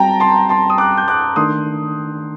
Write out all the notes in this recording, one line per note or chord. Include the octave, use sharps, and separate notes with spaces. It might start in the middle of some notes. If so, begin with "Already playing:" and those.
Already playing: G3 C4 F#4 G5 A5 A#5
A5 C6
A5 C6
D#6
D6 F#6
G6
D6 F#6
D#3 A3 D4 C6 D#6